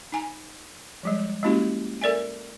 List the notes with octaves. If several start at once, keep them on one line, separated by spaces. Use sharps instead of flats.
D#4 G#5 A#5
F3 G3 G#3
G#3 A#3 C#4 E4 F#4 G4
A4 A#4 D5 E5 G#5